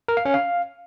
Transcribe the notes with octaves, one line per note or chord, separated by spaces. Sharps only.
A#4
F5
C#4
F5